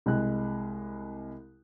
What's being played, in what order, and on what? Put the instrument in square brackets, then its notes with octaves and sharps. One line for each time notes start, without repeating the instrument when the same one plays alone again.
[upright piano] C2 G#3 F#6